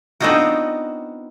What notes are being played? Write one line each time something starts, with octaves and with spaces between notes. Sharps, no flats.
B3 C4 D4 D#4 F4 F#4